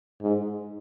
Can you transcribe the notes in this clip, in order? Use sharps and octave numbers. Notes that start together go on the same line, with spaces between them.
G#2